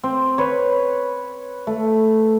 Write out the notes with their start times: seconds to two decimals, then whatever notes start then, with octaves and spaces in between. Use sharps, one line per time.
0.04 C4
0.38 B4 C#5
1.67 A3